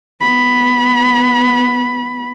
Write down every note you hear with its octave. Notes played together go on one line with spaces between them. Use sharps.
B3 B5